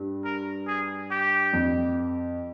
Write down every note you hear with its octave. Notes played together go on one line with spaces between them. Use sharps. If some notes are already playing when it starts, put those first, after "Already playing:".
Already playing: G2
A#4
G#4
G4
F2